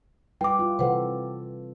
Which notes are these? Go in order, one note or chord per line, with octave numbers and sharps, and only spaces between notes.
G3 E4 B4 G5 D6
F4
C3 E3 A4 B4 C5 F#5